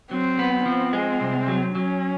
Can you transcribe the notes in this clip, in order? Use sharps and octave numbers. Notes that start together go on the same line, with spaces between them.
F#3 C4
B3
F3 C4
G#3
C2
F#3
F#3 C#4